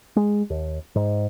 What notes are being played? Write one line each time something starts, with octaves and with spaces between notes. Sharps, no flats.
G#3
D#2
G#2